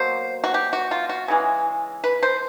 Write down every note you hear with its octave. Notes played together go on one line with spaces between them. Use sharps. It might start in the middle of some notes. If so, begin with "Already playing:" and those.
Already playing: B2 F#3 A#3 C5
F#4
G4
F#4
F4
F#4
C#3 E3 G#3
B4
C5